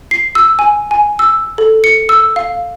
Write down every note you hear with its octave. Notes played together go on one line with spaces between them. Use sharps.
C7
E6
G#5
G#5
E6
A4
C#7
E6
F5